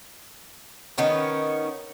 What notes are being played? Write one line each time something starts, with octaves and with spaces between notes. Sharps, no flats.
D#3 B3 C#4 D#4